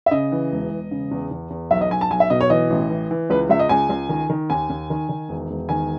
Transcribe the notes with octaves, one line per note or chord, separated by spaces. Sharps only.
E5
C#3 D#5
E3
E1
E1
C#3
E2
E2
E2
B1 E5
D#5
B1 G#5
A5
B1 G#5
E5
B2 D#5
C#5
E3 D#5
A1
E3
E3
C#2 B4
C#2 E5
D#5
C#2 G#5
C#2
D#3
D#3
D#2 G#5
D#2
D#3
D#3
E1
E1
D#3 G#5